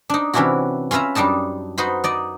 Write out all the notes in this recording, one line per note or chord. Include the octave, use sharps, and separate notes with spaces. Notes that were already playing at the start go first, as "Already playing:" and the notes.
D4 D#4
C3 E3 C#4 D4 E4 F#4
C#4 F4 B4 E5 A#5
F#2 G3 D4 D#4 A5
D#4 F#4 B4 C5 B5
D#4 D5 D#5